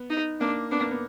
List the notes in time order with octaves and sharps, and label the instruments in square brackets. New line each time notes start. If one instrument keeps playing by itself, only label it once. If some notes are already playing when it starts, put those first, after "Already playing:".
Already playing: [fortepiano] B3
[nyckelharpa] D#4
[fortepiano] A#3 [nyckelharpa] D4
[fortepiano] B3 [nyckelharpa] D4
[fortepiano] A#3
B3